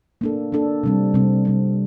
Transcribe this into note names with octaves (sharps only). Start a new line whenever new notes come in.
A#3 D4 A4
A#3 D4 A4
C3 G3 C4
C3 G3 C4
C3 G3 C4